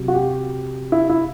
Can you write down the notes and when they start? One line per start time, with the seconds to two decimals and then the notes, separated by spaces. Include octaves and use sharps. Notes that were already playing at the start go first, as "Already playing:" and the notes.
Already playing: C3 F#3
0.08 F#4
0.14 G4
0.92 E4
1.10 E4